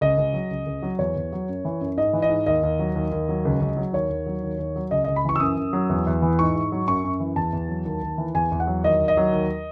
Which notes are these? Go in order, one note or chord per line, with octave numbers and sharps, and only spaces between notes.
C#2 D#5
C#2
F#3
C#2
C#2
F#3
E2 C#5
E2
F#3
F#2
E3
F#2
G#2 D#5
E3
D#5
G#2
D#2 D#5
D#2
F#3
D#2
D#2
F#3
C#2
C#2
F#3
D#2 C#5
D#2
F#3
D#2
D#2
F#3
C#2 D#5
C#2 D#5
B5
E3 C#6
E6
F#2 D#6
F#2
F#3
E2
E2
E3
G#2 C#6
G#2
F#3
F#2 C#6
F#2
E3
E2 A5
E2
F#3
D#2
D#2
E3
E2 G#5
E2
F#5
F#3
D#2 D#5
D#2
D#5
F#3
D#2